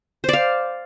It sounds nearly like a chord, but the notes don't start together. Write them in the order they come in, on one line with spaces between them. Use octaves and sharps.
C5 D5 F5